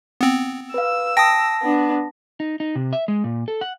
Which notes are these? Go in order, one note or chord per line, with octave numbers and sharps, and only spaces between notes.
B3 C4
B4 F5 E6
G5 A5 D#6 A#6
B3 D4
D#4
D#4
C3
E5
G#3
A#2
A4
F#5